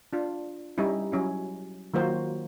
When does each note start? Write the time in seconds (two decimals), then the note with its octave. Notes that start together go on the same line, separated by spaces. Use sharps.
0.13 D4 F4
0.78 G3 C#4 D#4 E4
1.12 F#3 C#4 E4
1.94 D#3 F#3 A#3 F4 F#4 C5